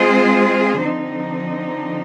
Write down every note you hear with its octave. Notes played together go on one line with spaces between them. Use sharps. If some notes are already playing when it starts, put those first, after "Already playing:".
Already playing: G#3 C4 F4 G#4 C5
D3 F3 C4 D#4